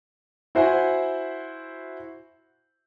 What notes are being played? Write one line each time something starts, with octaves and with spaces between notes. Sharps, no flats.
E4 F#4 C5 E5 F#5 G#5